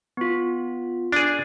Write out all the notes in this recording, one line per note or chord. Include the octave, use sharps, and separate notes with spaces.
B3 F4
D4 G#4